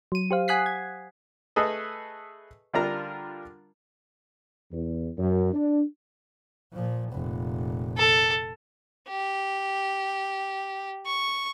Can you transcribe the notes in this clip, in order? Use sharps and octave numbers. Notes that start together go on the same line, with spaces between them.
F#3 D#7
G4 C5 F5
F#5 G#5 D#6 F#6 B6 C7
G#6
A3 G#4 A4 B4 D#5
D3 G3 D4 F4 A#4 A#5
E2
F#2
D4
A#2 F3
F1 A#2
A4
G4
C#6